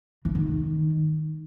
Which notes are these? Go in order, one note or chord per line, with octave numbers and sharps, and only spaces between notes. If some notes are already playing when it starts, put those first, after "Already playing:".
E3
D#3